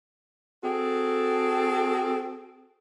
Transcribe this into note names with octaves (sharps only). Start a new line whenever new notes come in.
C4 F#4 G#4 A4